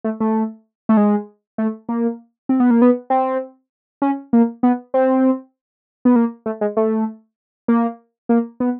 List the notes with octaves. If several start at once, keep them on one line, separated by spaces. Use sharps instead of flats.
A3
A3
A3
G#3
A3
A#3
C4
B3
A#3
B3
C4
C#4
A#3
B3
C4
B3
A#3
A3
G#3
A3
A#3
A#3
B3